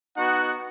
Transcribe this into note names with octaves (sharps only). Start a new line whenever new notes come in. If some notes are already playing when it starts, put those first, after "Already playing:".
B3 D#4 F#4 F#5